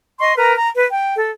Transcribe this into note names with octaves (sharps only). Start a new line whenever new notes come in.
D#5 C6 C#6
A#4 B4 A#5
A#5
B4
G5
A4